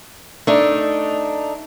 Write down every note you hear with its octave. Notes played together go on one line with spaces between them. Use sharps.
A3 D4 D#4